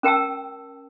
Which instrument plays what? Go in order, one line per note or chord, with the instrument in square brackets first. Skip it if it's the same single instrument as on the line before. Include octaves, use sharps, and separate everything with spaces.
[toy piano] C#4 A#4 G5 A5 E6